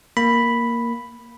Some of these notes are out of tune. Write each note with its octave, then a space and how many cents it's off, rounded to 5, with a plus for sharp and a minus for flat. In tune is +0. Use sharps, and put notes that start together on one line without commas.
A#3 +0 B5 +0